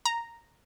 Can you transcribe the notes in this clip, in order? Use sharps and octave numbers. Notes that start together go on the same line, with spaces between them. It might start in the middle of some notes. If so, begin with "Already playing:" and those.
A#5